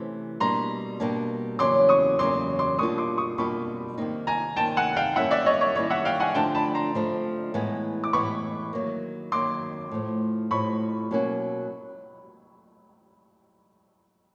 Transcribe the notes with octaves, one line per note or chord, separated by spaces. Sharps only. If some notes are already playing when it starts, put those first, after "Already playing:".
Already playing: C3 E3 A3 C#4
B2 G3 A#3 D4 A#5 C6
B2 G3 A#3 D4
E2 C#3 F#3 A#3 C#4 C6 D6
C#6 D#6
E2 C#3 F#3 A#3 C#4 C6 D6
C6 D6
B2 G3 A#3 D4 F4 C#6 D#6
C6 D6
C#6 D#6
B2 G3 A#3 D4 F4 B5 C#6
C3 D#3 G3 A#3 D#4
G#5 A#5
C3 D#3 G3 A#3 D#4 G5 A5
F#5 G#5
F5 G5
D#3 G3 A#3 C#4 E4 E5 F#5
D5 E5
C#5 D#5
C#5
D#3 G3 A#3 C#4 E4 C#5
E5 F#5
F5 G5
F#5 G#5
D3 F3 A3 D4 G5 A5
A5 B5
A#5 C6
D3 F3 A3 D4
A2 E3 G#3 B3
D6
A2 E3 G#3 B3 B5 C#6
D#3 F#3 A#3
D#3 F#3 A#3 C6 D6
A2 F3 A3
A2 F3 A3 B5 C#6
B2 F#3 A#3 C#4 F#4